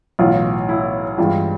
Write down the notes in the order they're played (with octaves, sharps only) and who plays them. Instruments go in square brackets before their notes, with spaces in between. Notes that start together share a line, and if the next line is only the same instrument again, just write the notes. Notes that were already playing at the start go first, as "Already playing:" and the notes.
[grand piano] B1 A2 E3 F4
E4
G2 E3 G#3 F4